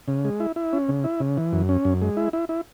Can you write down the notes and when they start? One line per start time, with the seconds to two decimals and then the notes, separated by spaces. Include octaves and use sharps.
0.08 C#3
0.25 G#3
0.40 E4
0.56 E4
0.73 C#4
0.89 C#3
1.04 E4
1.20 C#3
1.37 E3
1.53 F#2
1.69 C#4
1.85 F#2
2.02 G#3
2.17 E4
2.33 E4
2.49 E4